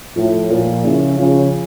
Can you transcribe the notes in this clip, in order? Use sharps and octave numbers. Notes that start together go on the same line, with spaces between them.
A2 F3
A#2 F3
C#3 E4
C#3 F3